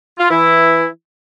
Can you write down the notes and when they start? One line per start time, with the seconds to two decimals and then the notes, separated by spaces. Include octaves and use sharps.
0.19 F4
0.30 E3 E4